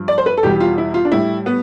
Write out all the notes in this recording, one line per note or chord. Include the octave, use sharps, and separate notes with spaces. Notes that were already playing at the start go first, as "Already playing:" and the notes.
Already playing: G2 F3
D5
C5
B4
A4
E2 B2 G3 G4
G4
F4
E4
F4
D4
A2 G3 E4
B3